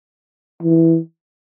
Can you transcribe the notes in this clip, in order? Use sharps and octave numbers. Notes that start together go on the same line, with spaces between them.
E3